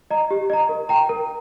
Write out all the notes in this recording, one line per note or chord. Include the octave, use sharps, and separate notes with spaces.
D#5 A#5
G4
D#5 A#5
A#4
G5 A#5
A#4